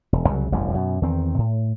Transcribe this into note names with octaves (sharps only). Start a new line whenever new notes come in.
E1
C2 C#3 E3 F#3
E1 A1 F#2 G3
F#2 B2
E2 D#3 C4
A2